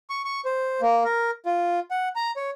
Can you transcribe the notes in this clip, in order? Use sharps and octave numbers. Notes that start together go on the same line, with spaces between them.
C#6
C#6
C5
A#3
A#4
F4
F#5
A#5
C#5